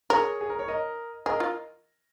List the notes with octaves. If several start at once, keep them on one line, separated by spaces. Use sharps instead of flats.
G#4 A#4 C#5
G#4
A#4
C#5
A#4 D#5
G#4 A#4 D#5
F4